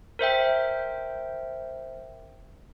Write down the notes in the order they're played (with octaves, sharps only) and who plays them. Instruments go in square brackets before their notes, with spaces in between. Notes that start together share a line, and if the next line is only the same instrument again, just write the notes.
[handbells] A#4 C5 E5 G5